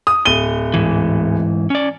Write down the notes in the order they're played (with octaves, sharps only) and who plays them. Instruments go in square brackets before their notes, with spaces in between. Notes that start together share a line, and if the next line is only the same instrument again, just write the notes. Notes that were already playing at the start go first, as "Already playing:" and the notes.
[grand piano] D#6
D1 D#7 G7
[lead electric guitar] G#2 E3
C#4 D5